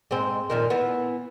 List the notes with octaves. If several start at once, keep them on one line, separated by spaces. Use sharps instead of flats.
G#2 G#3 C4
F2 A#2 D#3
E3 B3